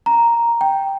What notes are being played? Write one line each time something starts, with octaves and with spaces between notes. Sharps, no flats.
A#5
G5